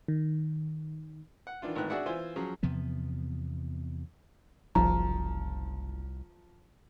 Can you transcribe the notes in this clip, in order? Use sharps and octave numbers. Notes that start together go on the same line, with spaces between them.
D#3
F#5
D#3 E3 D4 F4
G#1 A2 D#3 B4 F#6
D4 F#4 G#4 D5 E5 F#5
E3 F4 C5 E5 G#5
F3 F#3 C#4 G#4
E2 C3 F3 B3
F#1 C2 F3 A#5